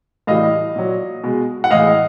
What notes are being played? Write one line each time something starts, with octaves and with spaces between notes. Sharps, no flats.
A2 E3 G3 D#5 F5
A#2 F#3
B2 G#3
F#5
A2 E3 G#3 D#5 F5